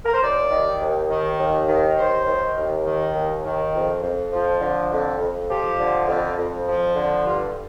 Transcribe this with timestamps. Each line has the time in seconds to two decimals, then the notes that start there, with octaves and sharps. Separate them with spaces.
0.05 A#4
0.14 C5
0.22 D#2 D5
0.51 D#3
0.81 D#2
1.10 D#3
1.39 D#2
1.68 D#3
1.98 D#2 C5
2.27 D#3
2.56 D#2
2.86 D#3
3.15 D#2
3.44 D#3
3.74 F2
4.03 F2
4.32 F3
4.61 D3
4.91 F2
5.20 F2
5.49 F3 G4
5.79 D3
6.08 F2
6.38 F2
6.67 F3
6.96 D3
7.25 G2 F4